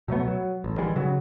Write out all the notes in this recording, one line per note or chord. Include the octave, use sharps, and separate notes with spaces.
B2 F#3 A3 B3
F#3
A1
D#3 E3 G3 G#3
C#3 F#3